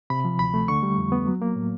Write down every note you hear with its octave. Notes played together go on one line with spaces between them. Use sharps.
C3 B5
F3
D2 B5
A3
D3 C#6
G3
F2
B3
F#3
A#3
A2